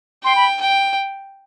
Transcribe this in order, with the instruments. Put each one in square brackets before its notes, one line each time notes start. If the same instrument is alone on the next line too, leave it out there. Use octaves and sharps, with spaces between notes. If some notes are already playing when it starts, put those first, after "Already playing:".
[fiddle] G5 [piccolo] C6
[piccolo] B5
[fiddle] G5